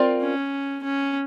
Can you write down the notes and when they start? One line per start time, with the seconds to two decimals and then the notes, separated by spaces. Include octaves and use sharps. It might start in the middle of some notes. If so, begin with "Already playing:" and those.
Already playing: C4 F4 A#4 D5
0.21 C#4
0.83 C#4